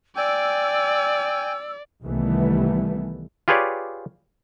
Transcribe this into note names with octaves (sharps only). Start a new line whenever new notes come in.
D5 G5 G#5 E6
C2 D#3 E3 G3 A3 B3
F4 G4 G#4 B4 C#5 D5